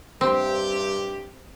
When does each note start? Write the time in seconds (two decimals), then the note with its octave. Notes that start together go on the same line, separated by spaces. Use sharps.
0.21 G2 C3 C4 G4